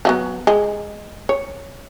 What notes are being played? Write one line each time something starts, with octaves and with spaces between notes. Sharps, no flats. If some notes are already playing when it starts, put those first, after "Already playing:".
F3 F#3 B3
G#3
C#5